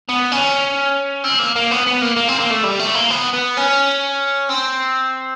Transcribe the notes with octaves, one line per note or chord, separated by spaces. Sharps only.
B3
C#4
C4
A#3
A#3
B3
B3
A#3
A#3
C4
A#3
A3
G3
A3
A#3
B3
B3
C#4
C4